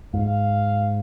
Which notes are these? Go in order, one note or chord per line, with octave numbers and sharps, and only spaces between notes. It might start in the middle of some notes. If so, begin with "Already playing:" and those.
G#2 F5